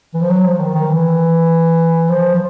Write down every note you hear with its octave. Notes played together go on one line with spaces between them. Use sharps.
E3
F3
F#3
F3
D#3
D#3
E3
F3
F3